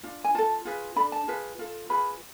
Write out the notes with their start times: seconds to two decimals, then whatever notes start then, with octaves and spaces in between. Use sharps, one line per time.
0.03 D4 F4
0.24 G#5
0.34 F4 A4 A5
0.65 F4 G#4 B4
0.96 D4 A4 B5
1.12 A5
1.28 F4 G#4 B4
1.59 F4 A4
1.89 F4 G#4 B4 B5